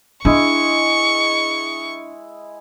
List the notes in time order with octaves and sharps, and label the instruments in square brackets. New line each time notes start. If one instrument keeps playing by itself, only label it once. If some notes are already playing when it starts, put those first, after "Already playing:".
[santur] G#3 E4 D#5 [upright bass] D4 [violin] C#6